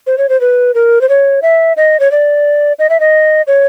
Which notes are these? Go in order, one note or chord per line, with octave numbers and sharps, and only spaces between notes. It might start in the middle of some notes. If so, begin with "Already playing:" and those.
C5
C#5
C5
B4
A#4
C5
C#5
E5
D#5
C#5
D5
D#5
E5
D#5
C#5